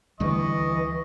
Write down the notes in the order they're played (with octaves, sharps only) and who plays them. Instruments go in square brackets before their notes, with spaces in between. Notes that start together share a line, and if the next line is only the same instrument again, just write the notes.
[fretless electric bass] D2 D3 G3 [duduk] E3 [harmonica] D#5 C#6